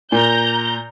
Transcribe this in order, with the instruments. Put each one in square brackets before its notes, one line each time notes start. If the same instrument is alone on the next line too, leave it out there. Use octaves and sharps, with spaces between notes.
[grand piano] A#2 [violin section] A#5 G6